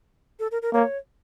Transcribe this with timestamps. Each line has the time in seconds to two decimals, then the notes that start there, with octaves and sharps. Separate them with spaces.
0.39 A4
0.51 A#4
0.62 A#4
0.73 A#3 C#5